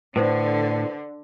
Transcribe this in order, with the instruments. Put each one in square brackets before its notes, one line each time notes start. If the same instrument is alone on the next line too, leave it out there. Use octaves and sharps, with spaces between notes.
[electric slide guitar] A2 [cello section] D3 [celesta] B4 C5